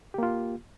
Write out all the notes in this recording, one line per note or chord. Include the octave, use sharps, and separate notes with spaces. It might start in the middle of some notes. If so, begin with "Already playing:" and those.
A#3 F4 G4